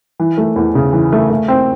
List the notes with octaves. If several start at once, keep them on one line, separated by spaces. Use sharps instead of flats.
E3
A3
E2
C#3
E3
A3
A3
C4